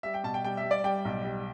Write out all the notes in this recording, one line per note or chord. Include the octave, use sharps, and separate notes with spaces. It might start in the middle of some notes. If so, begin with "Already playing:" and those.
G3 E5
G5
B2 A5
G5
G3 G5
E5
G3
D5
G3 G5
B1
G3